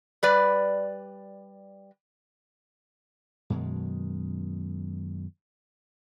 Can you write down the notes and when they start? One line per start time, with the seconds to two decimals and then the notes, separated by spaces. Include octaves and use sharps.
0.23 G3 B4 D5
3.50 F#2 B2 D#3 G#3